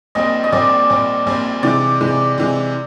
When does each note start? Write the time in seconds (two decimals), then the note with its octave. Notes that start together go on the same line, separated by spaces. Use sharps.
0.15 A#1 A#2 G3 C4 D#5
0.44 D#5
0.52 A#1 A#2 G3 C4 D5
0.90 A#1 A#2 G3 C4
1.26 A#1 A#2 G3 C4
1.63 C3 E3 G#3 D5
2.01 C3 E3 G#3
2.38 C3 E3 G#3